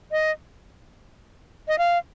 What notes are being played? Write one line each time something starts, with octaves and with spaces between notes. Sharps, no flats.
D#5
D#5
F5